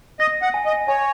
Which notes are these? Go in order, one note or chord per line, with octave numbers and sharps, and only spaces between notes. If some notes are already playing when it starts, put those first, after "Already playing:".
D#5 A#6
F#5
G#5
D#5
C#5 G#5